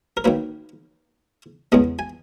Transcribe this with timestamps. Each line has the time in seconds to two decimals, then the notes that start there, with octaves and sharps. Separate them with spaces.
0.17 A#4
0.24 D#3 F#3 A#3 B4
1.72 E2 C#3 G#3 B3 D#5
1.99 G#5